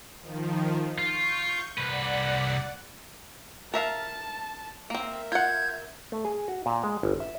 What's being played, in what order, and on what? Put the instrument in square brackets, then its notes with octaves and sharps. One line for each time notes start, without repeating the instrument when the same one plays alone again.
[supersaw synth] D#3 F3
[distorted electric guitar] F4 [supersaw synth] C#6 G6
[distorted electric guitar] C2 B4 [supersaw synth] D5 F#5
[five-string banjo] A#4 E5 F5 [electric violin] A5
[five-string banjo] A#3 C4 [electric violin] A#4 E5
[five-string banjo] F4 F#5 [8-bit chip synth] G6 G#6
[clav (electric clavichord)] A3
G#4
F#4
A#2
G#3
G1
E5